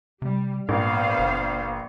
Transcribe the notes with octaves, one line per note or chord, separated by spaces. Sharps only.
C3 G3
A#1 G#2 B3 C5 F5
F#1